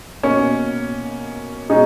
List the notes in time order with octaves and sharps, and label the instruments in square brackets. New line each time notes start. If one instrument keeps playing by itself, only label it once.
[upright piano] B2 A#3 D#4 [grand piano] C#4
[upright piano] B2 G#3 C#4 G#4 [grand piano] D#4